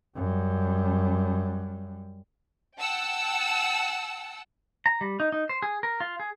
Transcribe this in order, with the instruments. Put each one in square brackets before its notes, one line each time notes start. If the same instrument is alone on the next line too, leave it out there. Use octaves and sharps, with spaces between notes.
[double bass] F#2 G3
[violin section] F#5 G5 A5 E6
[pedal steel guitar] A#5
G3
D#4
D#4
C5
G#4
A#4
F4
G#4